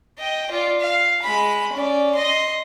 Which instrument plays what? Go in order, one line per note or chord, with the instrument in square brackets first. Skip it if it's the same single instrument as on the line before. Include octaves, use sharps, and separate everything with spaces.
[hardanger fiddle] D#5 G5
F4 D5
F5
G#3 B5
C#4 D5
D#5 C6